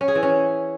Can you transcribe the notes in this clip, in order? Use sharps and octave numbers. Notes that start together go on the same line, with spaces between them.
C#4
G#4
E3
C#4